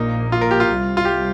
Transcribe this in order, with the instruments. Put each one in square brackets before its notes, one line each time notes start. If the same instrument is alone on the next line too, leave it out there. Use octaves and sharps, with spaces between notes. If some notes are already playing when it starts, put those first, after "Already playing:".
Already playing: [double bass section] A#1 A#2 A#3 [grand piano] D#4
[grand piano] F4
A#4
G4
F4
[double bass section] C2 C3 G3
[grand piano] F4
G4